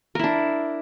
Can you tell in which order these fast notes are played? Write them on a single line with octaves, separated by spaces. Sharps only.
A#4 E4 D4